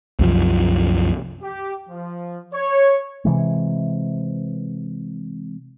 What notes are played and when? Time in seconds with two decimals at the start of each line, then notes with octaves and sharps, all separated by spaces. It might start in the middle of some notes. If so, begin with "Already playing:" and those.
0.19 C2 F#2 F3
1.43 G4
1.89 F3
2.54 C#5
3.25 C3 E3 G#3